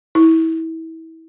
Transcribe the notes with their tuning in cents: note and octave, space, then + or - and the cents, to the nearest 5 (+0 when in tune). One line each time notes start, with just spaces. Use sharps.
E4 -25